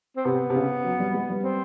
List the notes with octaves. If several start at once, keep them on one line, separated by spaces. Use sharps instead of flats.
C4
C3 B3
C3
C#3
F#3
G3
G#3
G3
C4